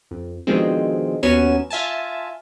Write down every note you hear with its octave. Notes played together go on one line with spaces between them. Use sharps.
F2
B2 D3 D#3 F3 G#3 C4
D#2 F#3 B3 C#4 G#5 E7
F4 E5 G#5 A5